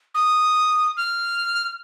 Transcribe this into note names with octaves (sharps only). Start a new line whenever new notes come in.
D#6
F6